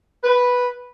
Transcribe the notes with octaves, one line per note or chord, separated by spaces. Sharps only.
B4